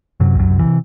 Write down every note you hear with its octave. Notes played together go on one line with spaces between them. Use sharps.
F#2 C3 F#3
C2 F#2 F#3
C2
C3 E3